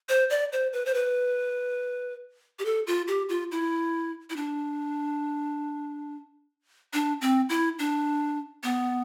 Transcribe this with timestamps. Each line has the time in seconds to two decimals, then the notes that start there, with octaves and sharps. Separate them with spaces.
0.09 C5
0.30 D5
0.52 C5
0.73 B4
0.85 C5
0.94 B4
2.59 G4
2.65 A4
2.87 F4
3.08 G4
3.29 F4
3.51 E4
4.30 E4
4.36 D4
6.93 D4
7.21 C4
7.49 E4
7.79 D4
8.63 B3